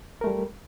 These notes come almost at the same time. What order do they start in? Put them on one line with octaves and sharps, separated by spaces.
A#4 A3 G3